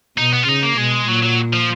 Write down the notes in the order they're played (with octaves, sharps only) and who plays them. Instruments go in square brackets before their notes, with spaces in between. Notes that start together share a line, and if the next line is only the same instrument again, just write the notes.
[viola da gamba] B2 [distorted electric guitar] D#4
[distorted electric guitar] B3
F4
[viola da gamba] C#3 [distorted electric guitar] D#4
[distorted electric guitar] A#3
[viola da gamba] B2 [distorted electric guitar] G#3
[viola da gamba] A#2 [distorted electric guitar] F#3
[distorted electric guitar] F#3
F3